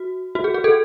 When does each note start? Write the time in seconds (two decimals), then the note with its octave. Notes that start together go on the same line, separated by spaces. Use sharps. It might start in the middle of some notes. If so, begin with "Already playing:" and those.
Already playing: F#4
0.35 F#4
0.44 G#4
0.54 G#4
0.64 A4